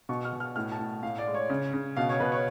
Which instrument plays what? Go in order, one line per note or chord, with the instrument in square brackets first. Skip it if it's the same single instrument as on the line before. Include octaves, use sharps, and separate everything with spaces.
[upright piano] B2 C#6
F6
B2
F6
A2 F6
A5
A2
A2 F5
D5
G#3
C#5
C#3
C#3
B2 F5
C#5
B2 B4
C#5